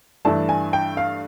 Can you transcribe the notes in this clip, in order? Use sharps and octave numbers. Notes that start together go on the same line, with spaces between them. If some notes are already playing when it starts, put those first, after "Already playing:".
G2 E3 A3 D4 A5
G#5
G5
F5